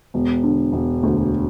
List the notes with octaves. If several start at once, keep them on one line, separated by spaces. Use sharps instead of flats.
E1
D3
E1
D2